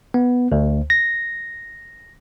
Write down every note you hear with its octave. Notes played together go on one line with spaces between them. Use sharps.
B3
D2
A#6